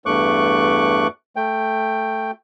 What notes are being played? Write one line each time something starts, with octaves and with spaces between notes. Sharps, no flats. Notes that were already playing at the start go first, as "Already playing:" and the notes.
E2 G2 A3 C#6 D6 F#6
A3 G5